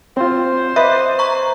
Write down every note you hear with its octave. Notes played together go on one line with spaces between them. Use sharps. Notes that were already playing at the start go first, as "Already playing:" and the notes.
C4 F4 C5
B4 D#5 E5
A#5 C#6